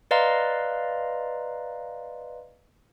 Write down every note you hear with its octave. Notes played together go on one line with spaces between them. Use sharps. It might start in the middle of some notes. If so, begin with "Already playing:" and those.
B4 D5 D#5 F5 A#5 C6